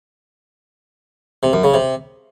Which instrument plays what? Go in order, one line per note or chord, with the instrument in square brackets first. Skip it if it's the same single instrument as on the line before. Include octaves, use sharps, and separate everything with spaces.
[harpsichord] C3
F#2
C#3
C3